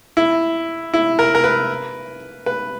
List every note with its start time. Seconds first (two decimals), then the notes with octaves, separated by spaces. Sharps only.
0.17 E4
0.94 E4
1.19 A#4
1.35 A#4
1.44 B4
2.46 B4